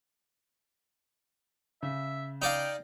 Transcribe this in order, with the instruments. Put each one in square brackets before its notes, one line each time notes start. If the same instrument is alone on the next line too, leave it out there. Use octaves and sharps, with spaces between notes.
[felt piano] C#3 [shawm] E5
[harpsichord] D#4 D5 F5 [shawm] G5